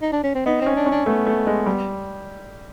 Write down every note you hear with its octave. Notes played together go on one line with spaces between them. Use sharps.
D#4
D4
C#4
C4
B3 D#4
C4
C#4
D4
C#4
D4
A3 B3
A3
G#3
G3